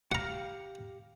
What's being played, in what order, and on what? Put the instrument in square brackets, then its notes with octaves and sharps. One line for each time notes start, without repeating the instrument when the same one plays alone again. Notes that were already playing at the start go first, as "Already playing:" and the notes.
[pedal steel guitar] G4 F5 F6 [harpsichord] F#5 A#5